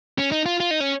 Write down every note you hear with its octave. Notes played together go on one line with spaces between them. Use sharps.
C#4
D#4
F4
F4
D#4
C#4